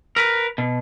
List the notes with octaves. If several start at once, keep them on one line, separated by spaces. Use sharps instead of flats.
A#4 B4
B2